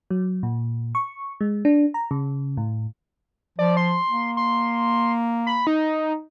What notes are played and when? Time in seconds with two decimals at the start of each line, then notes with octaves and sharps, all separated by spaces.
0.11 F#3
0.43 A#2
0.95 C#6
1.41 G#3
1.65 D4
1.94 A#5
2.11 C#3
2.57 A2
3.59 F3 D5
3.77 C6
4.10 A#3
4.37 C6
5.47 B5
5.67 D#4